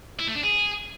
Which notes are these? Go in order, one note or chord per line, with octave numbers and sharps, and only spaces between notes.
E4
A3
D4
G#4